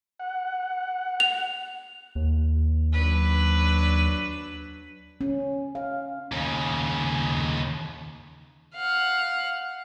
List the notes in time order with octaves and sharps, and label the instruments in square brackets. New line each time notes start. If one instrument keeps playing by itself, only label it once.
[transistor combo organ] F#5
[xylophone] F7
[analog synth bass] D#2
[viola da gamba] F#3 D4 B4
[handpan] C#4
F5
[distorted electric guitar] D#2 C#3
[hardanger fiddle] F5 F#5